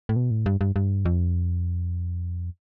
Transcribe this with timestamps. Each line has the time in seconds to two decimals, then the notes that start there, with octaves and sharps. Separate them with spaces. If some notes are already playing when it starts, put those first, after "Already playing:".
0.09 A2
0.16 B2
0.31 A2
0.46 G2
0.61 G2
0.76 G2
1.05 F2